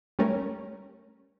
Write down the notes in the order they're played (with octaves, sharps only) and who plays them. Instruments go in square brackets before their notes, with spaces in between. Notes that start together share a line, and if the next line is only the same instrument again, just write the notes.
[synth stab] G3 A3 C#4 A#4